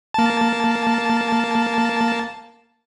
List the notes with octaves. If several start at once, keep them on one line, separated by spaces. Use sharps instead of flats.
A#3 A5